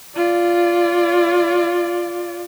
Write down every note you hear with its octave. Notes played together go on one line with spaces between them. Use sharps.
F4 D5